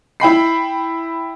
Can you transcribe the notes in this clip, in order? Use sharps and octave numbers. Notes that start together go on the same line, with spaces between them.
E4 G5 B5 C7